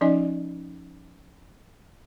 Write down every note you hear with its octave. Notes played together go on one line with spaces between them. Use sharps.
F3 C#4 D#4 D5 D#5 G#5